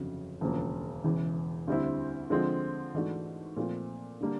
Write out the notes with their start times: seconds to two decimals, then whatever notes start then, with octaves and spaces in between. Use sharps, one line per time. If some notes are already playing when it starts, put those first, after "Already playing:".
Already playing: G1 F2 C#3 F#3
0.41 E1 D2 C#3 F3 A#3
1.04 E1 E2 C#3 E3
1.68 D2 D3 G3 C4 E4
2.30 D3 F3 G#3 C4 F4
2.94 G#2 E3 A3 D4 F#4
3.57 A#2 F3 A3 C4 F4
4.21 D3 G3 A#3 D4